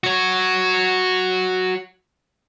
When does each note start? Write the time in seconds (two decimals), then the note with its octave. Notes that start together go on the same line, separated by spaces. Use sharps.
0.04 F#4 C#5